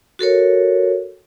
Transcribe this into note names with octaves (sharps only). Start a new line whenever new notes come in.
F#4 A4 A#4 C#5